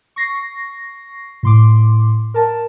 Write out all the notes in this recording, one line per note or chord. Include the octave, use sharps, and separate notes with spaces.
C#6 A#6 C7
A2 C6 D6
A#4 A5